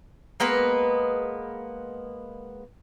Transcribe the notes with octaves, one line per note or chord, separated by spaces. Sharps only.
G#3 A#3 B3 B4